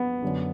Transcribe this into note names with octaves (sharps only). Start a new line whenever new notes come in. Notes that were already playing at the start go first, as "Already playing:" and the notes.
Already playing: B3
F#2 D3